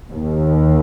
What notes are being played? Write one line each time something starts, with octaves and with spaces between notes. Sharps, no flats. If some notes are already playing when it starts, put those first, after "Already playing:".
D#2